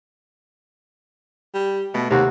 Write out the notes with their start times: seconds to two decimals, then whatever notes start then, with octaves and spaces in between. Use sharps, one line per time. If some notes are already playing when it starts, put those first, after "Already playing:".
1.54 G3
1.94 B2 A3
2.10 D#2 C3 F#4